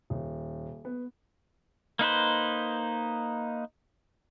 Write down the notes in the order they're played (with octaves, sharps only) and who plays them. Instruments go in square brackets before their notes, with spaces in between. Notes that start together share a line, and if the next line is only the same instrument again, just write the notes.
[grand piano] D#1
B3
[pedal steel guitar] A#3 D#4 B4 C5